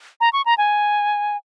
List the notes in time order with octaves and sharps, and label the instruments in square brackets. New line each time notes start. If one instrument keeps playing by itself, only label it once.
[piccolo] A#5
C#6
A#5
G#5